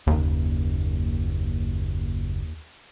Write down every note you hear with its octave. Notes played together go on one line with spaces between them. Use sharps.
F#1 D#2